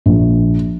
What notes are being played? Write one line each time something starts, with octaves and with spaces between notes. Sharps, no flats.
A#1